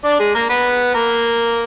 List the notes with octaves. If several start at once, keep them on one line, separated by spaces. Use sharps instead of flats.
D4 D5
G#3 G#4
A#3 A#4
B3 B4
A#3 A#4